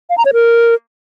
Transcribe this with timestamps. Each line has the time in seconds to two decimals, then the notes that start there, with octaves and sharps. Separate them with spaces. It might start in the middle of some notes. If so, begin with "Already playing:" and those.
0.10 F5
0.18 A#5
0.25 C#5
0.33 A#4